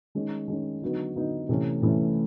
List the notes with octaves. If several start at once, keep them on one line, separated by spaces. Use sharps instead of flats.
D#3 G#3 C#4
D#3 G#3 C#4
D3 F#3 B3 D#4
D3 F#3 B3 D#4
C3 E3 A3 C#4
C3 E3 A3 C#4